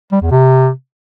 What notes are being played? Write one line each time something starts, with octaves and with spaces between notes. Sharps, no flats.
G3
E2
C3